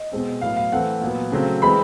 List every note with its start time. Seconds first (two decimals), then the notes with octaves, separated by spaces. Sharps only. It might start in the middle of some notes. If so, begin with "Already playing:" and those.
Already playing: D#5
0.12 B2 G#3 C4
0.41 A2 F#3 B3 F5
0.56 F5
0.72 E3 A3 C4 F#5
1.01 A#2 F#3 B3
1.32 C#3 F#3 A3 C4
1.62 E3 G#3 C4 B5